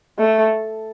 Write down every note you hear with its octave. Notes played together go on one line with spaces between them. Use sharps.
A3